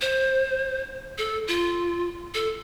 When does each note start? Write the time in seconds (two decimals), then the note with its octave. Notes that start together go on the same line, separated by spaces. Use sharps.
0.01 C5
1.18 A4
1.48 F4
2.34 A4